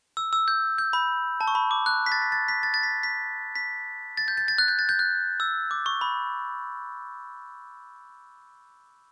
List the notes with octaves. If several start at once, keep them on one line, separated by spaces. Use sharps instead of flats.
E6
E6
G6
G6
B5
A5
C#6
B5
D6
F#6
B6
A6
B6
A6
B6
A6
A6
B6
B6
B6
A6
G6
A6
A6
F#6
G6
A6
G6
F#6
E6
D6
C#6
B5